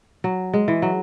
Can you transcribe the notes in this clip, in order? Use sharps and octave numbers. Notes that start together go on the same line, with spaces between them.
F#3
G#3
E3
F#3